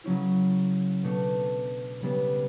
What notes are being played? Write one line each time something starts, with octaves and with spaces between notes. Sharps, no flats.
C#3 F#3 C#4 E4
B2 A3 D4
C#3 G3 B3 D4